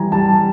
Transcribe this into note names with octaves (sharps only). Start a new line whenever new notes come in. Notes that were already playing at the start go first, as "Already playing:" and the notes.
Already playing: E3 G3 G#5 A#5
G3 A5